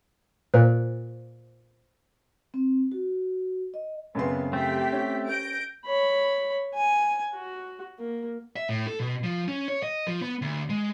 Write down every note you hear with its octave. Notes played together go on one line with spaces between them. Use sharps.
A#2 C5
C4
F#4
D#5
F#2 C#3 B3 C4 C6
A3 C4 G4 G5 B6
C#4
G6 A#6 D7
C#5 B5
G#5
F#4
A#3
E5
A2
A4
B2
F3
C#4
C#5
D#5
F3
B3
D2
G#3